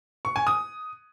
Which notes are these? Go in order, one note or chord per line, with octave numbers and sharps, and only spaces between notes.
C#6
G#5
D#6